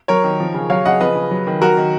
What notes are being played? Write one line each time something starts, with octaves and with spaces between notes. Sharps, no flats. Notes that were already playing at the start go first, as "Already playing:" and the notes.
F#3 A#4 C#5
D#3
F3
C#3
F#3 C#5 F5
C#3 D#5 F#5
F3 B4 D#5
C#3
F#3
D#3
F#3 F#4 A#4
D#3